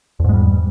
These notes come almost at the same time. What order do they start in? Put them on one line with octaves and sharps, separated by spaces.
E2 G#2 G#3 G3